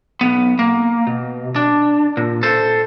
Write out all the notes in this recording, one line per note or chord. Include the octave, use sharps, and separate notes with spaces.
B1 B3
A#3
B2
D4
A#2
A4 C5